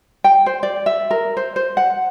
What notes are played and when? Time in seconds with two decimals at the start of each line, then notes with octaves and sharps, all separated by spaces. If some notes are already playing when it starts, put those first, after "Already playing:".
0.24 G5
0.46 C5
0.63 D5
0.86 E5
1.11 A#4
1.37 C5
1.56 C5
1.77 F#5